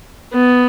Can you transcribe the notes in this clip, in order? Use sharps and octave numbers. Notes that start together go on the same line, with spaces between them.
B3